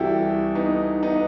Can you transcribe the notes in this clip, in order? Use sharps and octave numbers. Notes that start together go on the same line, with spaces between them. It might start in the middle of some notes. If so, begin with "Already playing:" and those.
Already playing: C2 C3 E3 E4 F#4 G4 A4
B3 D#4
B3 D#4